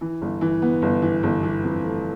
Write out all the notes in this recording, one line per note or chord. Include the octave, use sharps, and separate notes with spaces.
E3
G1
E3
B3
G1
E3
G1
E3
F2
A3